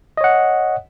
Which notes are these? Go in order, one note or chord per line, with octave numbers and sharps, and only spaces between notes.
C#5 D#5 F#5